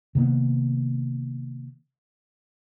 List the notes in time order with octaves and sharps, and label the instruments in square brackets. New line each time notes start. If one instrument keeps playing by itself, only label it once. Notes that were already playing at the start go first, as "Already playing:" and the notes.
[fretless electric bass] C3 D#3 A#3 B3